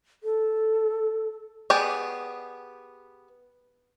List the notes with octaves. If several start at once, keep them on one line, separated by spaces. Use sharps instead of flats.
A4
B3 G4 G#4 D5